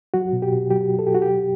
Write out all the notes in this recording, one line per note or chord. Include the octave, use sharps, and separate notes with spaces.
F#3 F#4
B2
G4
B2
F#3 G4
F#3
A4
B2 G4
F#4
G4
F#3